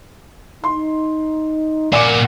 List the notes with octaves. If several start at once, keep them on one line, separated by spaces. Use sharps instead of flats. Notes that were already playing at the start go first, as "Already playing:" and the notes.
D#4 C6
A#2 F#4 A#4 D5 G#5 D6